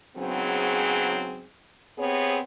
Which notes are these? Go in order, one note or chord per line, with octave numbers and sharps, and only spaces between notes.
G#2 C#3 F#3 B3 C4 G#4
C3 B3 C4 G#4 C#5